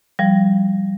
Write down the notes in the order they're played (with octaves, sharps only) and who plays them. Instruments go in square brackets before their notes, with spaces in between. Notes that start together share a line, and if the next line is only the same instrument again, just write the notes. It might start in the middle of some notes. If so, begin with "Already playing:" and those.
[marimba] F3 G3